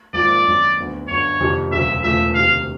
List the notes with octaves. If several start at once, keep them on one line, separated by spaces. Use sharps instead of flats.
G#1 G#2 F3 A#3 D5
F#2 D#3 G#3 C4
D2 D3 F#3 B3
G1 F#2 D3 C#5
F2 C3 D#3 G3 A#3
E1 D2 C#3 F#3 E5
E1 E2 C#3 F3 A3 E5
D2 C3 D#3 F5